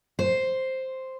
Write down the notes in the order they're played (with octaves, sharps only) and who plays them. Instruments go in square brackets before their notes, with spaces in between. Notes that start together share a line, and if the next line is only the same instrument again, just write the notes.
[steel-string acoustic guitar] C5